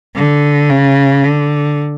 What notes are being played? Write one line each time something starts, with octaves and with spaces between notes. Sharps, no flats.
D3
C#3
D3